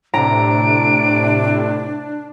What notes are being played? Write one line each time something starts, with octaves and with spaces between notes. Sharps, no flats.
A2 C3 D4 A#5 D7